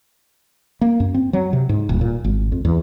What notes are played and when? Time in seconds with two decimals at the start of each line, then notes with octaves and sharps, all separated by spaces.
0.81 A#3
1.00 F#2
1.14 C4
1.33 F#3
1.53 C3
1.69 G#2
1.89 D#1
2.01 A#2
2.24 G#1
2.52 F2
2.65 E2